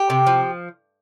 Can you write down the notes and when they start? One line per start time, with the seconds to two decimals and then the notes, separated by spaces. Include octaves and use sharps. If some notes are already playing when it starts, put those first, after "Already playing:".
Already playing: G4
0.10 C3
0.27 F3